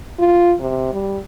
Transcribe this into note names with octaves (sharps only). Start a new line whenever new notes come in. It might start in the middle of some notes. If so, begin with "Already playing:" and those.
F4
C3
G3